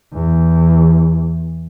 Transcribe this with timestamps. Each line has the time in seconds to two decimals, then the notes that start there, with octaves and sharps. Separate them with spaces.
0.13 E2